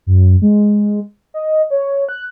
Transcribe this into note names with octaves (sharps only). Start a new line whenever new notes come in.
F#2
G#3
D#5
C#5
F#6